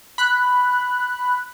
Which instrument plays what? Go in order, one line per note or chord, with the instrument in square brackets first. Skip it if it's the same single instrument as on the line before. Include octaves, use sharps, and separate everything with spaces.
[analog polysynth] B5 F#6